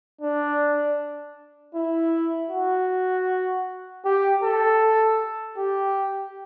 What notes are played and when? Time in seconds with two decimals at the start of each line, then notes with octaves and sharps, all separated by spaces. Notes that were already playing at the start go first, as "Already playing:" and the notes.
0.21 D4
1.75 E4
2.51 F#4
4.05 G4
4.44 A4
5.58 G4